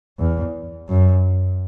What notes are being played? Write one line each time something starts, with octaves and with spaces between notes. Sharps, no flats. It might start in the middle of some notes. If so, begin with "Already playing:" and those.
E2
F#2